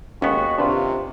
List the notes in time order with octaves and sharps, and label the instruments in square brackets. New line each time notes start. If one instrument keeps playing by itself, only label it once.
[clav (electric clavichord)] D#2 B3 [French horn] G#3 [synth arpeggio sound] C#4 [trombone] F#4
[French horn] C3 [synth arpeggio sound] D4 B4 [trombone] F4